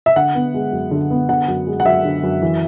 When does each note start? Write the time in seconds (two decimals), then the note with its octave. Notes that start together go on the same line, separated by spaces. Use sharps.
0.06 E5
0.16 D3 F#5
0.35 B3
0.54 G#3
0.72 F#2
0.91 D3
1.10 B3
1.29 D3 F#5
1.48 F#2
1.67 G#3
1.80 F#5
1.85 F#2 E5
2.05 D3
2.23 F#2
2.42 E3